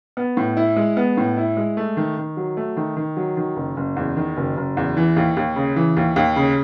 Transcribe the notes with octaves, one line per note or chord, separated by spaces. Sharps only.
B3
A2
E4
G#3
B3
A2
E4
G#3
A3
D#3
D#3
F#3
A3
D#3
D#3
F#3
D#3
F#1
F#1
E2
D#3
F#1
F#1
E2
E3
D#2
D#2
C#3
E3
D#2
D#2
C#3